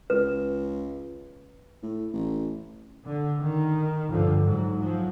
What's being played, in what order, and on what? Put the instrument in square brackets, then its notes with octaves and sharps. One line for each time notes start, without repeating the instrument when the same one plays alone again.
[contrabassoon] C#2 [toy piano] B4
[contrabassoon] A2
A1
[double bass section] D3
D#3
G2 D3 F3
G#2 F#3
F3 F#3